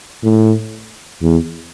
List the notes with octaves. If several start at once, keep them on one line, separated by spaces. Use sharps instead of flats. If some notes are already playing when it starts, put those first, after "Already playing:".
A2
E2